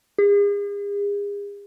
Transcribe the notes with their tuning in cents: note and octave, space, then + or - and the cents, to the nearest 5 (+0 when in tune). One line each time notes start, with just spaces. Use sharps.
G#4 -40